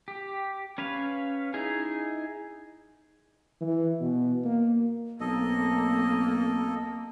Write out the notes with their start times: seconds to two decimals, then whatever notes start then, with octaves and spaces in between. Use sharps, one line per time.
0.08 G4
0.78 C#4 B4 C#5 F5
1.54 D#4 E4 G#4
3.61 E3
4.01 B2
4.45 A#3
5.20 B1 A#3 C4 A4 D#5